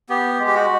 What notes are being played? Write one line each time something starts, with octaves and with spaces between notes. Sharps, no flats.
B3 G4
G#3
G4
F#4